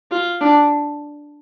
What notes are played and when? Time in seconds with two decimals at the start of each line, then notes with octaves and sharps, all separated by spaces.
0.11 F4
0.41 D4